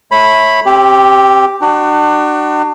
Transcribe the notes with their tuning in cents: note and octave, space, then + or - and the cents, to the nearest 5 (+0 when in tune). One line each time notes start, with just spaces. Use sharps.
A3 -15 C#5 -30 B5 +0
C4 +30 G4 +0
D4 +35 F#4 +35